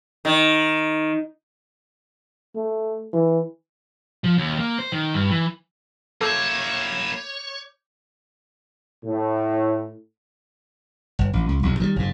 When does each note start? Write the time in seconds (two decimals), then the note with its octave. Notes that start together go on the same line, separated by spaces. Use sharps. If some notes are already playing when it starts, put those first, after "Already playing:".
0.25 D#3
2.56 A3
3.13 E3
4.24 F3
4.38 D#2
4.59 A#3
4.79 C5
4.92 D#3
5.14 G2
5.31 E3
6.21 A#3 E4 A4 C#5 D6 G6 G#6
9.04 A2
11.19 G1
11.33 A1
11.49 C#2
11.63 B1 E2
11.80 D#3 F3 G3
11.96 F#1 G#2